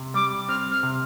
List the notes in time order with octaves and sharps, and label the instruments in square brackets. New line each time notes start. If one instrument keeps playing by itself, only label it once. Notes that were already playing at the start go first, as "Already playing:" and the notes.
Already playing: [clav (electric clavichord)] C3
[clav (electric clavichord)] G3 [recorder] D6
[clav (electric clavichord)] C4 [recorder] F6
[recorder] F6
[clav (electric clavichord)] C3